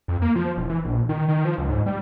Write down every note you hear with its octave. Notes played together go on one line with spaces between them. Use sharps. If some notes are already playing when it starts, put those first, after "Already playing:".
F2
A#3
F3
E1
E3
A#1
D#3
D#3
F3
C#2
G#2
G3